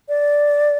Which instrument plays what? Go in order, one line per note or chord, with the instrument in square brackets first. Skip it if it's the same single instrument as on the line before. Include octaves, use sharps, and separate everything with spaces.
[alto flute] D5